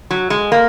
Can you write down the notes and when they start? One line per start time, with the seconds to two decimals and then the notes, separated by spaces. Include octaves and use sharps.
0.10 F#3
0.30 G#3
0.52 A#3